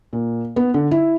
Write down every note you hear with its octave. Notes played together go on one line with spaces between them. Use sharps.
A#2
B3
D3
E4